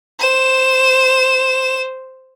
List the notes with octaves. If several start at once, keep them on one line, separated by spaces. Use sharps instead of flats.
C5 E7